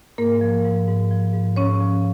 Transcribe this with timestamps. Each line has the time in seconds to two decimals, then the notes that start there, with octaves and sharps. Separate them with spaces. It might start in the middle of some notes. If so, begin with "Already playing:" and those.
0.18 G#2 A#3 A#4
0.41 F3
0.65 G#2
0.88 G#2
1.11 F3
1.34 G#2
1.56 G#2 C#4 C#5
1.80 F3